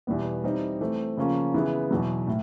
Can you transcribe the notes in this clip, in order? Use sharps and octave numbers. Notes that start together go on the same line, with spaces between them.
E2 B2 G3 B3
E3 G3 C4 D#4
E3 A3 C4
C#3 F3 A#3 C#4 F4
C#3 E3 G#3 B3 E4
E2 B2 F#3
A2